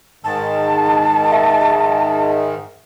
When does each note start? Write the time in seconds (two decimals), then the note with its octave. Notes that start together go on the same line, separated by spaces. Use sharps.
0.24 G#2 D#3 A5
1.32 E5